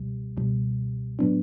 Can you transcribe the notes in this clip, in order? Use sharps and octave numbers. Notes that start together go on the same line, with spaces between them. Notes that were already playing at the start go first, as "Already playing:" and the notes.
Already playing: C#2 B2 G3
C#2 B2 G3
A2 F#3 B3 D4